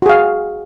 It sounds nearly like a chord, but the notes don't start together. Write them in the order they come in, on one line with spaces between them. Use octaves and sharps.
F#4 G#4 F5